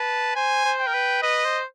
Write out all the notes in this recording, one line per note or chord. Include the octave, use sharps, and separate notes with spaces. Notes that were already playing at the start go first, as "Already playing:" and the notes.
Already playing: B4 A5
C5 G#5
C5
G5
A#4
B4
B4 D#5
C5